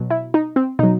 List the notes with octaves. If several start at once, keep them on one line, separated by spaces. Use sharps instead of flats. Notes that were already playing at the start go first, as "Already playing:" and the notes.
Already playing: B2 F#3
E4
D#4
C4
B2 F#3 D#4